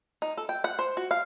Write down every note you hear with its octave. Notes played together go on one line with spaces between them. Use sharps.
D#4
A4
G5
F#5
C5
F#4
F5